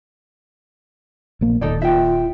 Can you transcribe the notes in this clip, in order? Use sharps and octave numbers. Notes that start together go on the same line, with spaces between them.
A#1 A#3
D#1 D#2 D#4 A4 D5
F4 E5 G5